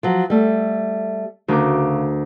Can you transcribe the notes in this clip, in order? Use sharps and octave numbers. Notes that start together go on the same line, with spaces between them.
F3 F#3
G3 A3
D2 C#3 A#4 D6